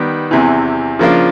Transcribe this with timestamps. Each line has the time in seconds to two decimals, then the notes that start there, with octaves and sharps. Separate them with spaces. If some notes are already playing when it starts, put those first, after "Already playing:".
Already playing: D#3 G3 B3
0.31 E2 C3 E3
0.99 C#3 F3 A#3 D4 F4